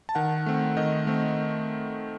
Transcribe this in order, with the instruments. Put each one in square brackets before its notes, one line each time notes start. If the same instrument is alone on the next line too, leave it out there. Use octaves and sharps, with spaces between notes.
[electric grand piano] A5
D#3 F#5
A3 C4
D#3 D#5
A3 C4